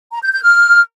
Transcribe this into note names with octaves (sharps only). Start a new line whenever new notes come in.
A#5
G6
G6
F6